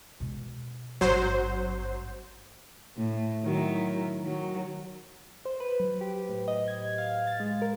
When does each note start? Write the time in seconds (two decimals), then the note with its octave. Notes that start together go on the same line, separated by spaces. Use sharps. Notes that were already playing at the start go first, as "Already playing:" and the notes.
0.20 B2 G#3
1.01 G#1 G2 F#3 C5
2.97 A2
3.44 D#3 F#3 E4
4.22 D#3 F#3
5.45 C5
5.60 B4
5.80 F#3
6.01 G4
6.29 A2
6.48 D#5
6.68 G#6
6.98 F5
7.27 A6
7.40 G#3
7.62 A#4